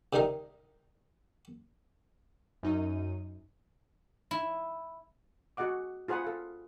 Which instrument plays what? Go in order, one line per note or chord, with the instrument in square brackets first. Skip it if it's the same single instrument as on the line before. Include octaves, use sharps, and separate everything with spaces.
[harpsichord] C3 D#3 G3 D#4 A#4
[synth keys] F#2 D#4 D#7
[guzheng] E4
[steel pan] F#4 G#4 D#5 F#5 D6
F4 G#4 C5 F#5 B5 D#6
A4 F5